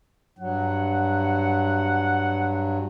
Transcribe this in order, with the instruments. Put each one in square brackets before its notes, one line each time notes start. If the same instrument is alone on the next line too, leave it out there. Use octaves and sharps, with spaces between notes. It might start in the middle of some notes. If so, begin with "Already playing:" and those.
[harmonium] G2 F#3 [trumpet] F#5